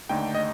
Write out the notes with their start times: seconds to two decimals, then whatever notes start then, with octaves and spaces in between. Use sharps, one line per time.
0.09 D#2 D3 A3 D#4 G5
0.35 D#5